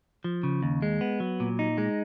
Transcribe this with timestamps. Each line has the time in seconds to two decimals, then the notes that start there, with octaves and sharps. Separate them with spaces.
0.24 F3
0.43 C#3
0.62 D#2
0.82 G#3
1.01 B3
1.20 F#3
1.40 A#2
1.59 D#4
1.78 G#3